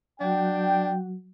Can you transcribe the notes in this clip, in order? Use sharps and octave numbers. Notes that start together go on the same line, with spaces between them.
F#3 D4 F#4 G5